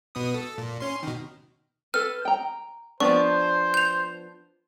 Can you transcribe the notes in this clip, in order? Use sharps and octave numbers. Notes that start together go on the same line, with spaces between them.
B2 B3 D#6
A4
A#2
C#4 C6
B2 D#3
A4 B4 F6
G5 A#5
F3 B3 D4 C5 C#6
G6 F7